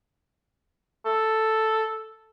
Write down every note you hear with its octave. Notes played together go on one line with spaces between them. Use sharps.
A4